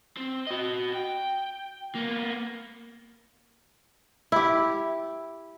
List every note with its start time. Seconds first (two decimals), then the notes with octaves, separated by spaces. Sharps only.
0.17 C4
0.47 F#4 D#5
0.93 G5
1.95 A#3 B3
4.32 E4 G4